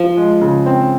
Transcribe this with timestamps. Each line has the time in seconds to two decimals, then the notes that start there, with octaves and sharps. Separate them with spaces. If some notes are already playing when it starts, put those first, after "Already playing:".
Already playing: F3
0.17 G#3
0.41 C#3
0.66 C4